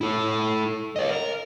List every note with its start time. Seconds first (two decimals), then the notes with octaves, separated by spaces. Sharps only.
0.01 E4 A4
0.96 C#5 D#5
1.10 A#4